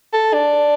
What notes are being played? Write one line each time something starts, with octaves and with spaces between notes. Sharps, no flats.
A4
D4